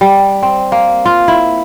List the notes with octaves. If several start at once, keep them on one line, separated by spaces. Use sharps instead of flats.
G3
C4
A#3
F4
E4